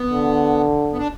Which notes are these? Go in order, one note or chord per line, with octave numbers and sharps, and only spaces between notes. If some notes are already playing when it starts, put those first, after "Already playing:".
Already playing: B3
D3
B3
D4